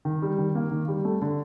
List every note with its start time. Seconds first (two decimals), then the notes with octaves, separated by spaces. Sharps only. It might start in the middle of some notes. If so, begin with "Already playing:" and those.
0.05 D#3
0.22 G3
0.38 D#3
0.55 A#3
0.71 D#3
0.88 G3
1.05 A3
1.22 D3